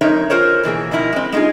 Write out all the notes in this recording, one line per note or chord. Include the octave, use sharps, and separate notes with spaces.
F2 G#3 D#4 A#4 C#5 E5
F4 G#4 A#4 C5 C#5
B2 E3 A#3 G#4
B2 D#3 F3 E4 A#4
G#3 C4
G#3 A3 D#4 F4 G#4